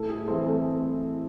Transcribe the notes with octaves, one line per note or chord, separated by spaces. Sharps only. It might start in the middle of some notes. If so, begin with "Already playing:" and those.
Already playing: A2 A4
G#4
E3 A3 C4 A4
A4